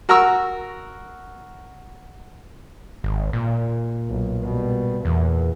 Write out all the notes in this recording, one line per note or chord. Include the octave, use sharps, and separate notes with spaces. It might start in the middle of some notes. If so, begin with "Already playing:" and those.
F#4 A#4 A#5 C#6 E6
G#1
A#2
B1
B2 G3
E2 A#2 E3